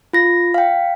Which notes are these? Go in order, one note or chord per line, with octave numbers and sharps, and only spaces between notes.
F4 A#6
F5 G5